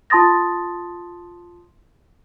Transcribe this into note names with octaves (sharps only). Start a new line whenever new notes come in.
F4 A5 C6 D#6 A6 A#6